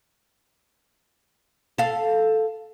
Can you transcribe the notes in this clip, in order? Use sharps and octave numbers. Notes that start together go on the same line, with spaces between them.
A4 F5